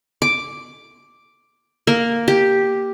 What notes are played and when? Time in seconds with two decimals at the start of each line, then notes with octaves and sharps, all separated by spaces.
0.22 D6
1.87 A#3
2.28 G4